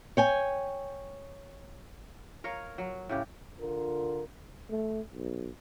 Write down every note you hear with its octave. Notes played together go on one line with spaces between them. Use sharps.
C#5 G5 G#5
A#4 C#5 D#5 F5
F#3
A2 C#3 G4
D3 F4 A#4
A3
B1